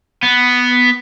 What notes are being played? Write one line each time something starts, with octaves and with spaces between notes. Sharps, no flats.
B3